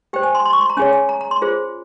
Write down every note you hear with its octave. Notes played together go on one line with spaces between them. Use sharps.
G4 C5 G5
G#5
C6
C6
C#6
C6
A#5
C#4 G#4 C#5 G#5
G#5
A#5
A#5
C6
F4 G#4 C5